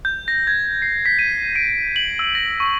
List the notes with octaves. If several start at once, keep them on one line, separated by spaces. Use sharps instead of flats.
G6
A#6
G#6
C7
B6
D#7
D7
F#7
E6
A#6
C#6